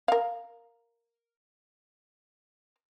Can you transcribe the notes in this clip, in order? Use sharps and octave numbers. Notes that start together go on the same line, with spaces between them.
A#4 F5